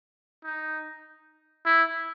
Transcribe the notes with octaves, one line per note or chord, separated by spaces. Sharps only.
D#4
E4